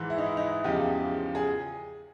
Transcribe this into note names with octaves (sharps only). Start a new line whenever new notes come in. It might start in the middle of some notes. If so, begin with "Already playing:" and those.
Already playing: G#2 E3
E4
D#4
E4
D#4
E2 C#3 F3 G4
G#4